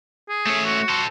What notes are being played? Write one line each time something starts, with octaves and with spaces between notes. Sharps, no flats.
G#4
A3 C#4
F#4
A4 C5